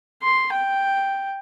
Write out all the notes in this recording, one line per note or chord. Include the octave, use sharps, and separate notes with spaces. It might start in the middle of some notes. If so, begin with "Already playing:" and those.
C6
G5